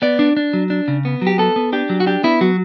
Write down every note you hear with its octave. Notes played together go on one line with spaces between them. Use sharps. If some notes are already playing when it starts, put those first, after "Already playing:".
B3 D5
D4
D4
F#3
D4
C#3
B3
F#3
G4
B3 A4
B3
D4 G4
F#3
F#4
D4 G4
B3 E4
F#3 F#4